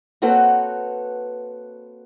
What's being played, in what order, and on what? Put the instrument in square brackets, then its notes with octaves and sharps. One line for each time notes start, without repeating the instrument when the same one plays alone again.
[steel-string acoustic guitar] A#3 C4 F#4 A4 B4 C#5